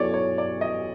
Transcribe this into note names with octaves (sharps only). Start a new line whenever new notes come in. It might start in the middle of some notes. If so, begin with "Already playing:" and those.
Already playing: F#3 B3 E4 A4 C#5 D5
C#5
D5
D#5